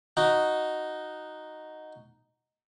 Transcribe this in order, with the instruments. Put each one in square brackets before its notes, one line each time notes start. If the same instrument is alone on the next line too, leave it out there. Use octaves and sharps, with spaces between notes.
[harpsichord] D#4 F#4